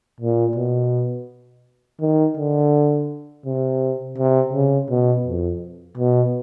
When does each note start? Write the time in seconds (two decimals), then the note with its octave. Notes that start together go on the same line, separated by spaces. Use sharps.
0.20 A#2
0.55 B2
2.01 D#3
2.37 D3
3.46 C3
4.18 C3
4.53 C#3
4.90 B2
5.26 F2
5.98 B2